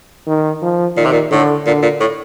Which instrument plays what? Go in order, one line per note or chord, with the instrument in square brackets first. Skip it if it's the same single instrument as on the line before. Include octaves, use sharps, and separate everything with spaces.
[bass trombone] D#3
F3
[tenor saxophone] A#2 [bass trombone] D#3
[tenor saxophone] C3
A#2
[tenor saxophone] A2 [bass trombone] D3
[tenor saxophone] A#2 [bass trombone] D3
[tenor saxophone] A#2
A2